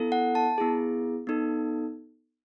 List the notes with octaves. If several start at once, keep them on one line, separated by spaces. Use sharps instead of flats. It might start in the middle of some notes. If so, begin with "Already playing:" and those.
Already playing: B3 E4 A4
F#5
A5
B3 E4 G#4
B3 D#4 A4